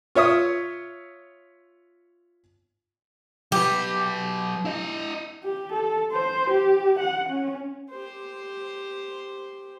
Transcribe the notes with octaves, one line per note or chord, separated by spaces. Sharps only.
F4 C#5 E5 D#6
F#3 G4 B4
E4 D#5
G4
A4
C5
G4
F#5
C#4
G4 C5